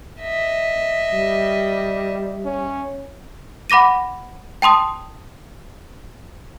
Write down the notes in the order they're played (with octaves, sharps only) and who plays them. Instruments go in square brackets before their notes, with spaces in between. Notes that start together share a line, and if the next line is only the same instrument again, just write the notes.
[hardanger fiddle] D#5 E5
[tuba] G3
[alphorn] C#4
[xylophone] F#5 B5 D6 A#6 D#7
G5 A5 C6 D#6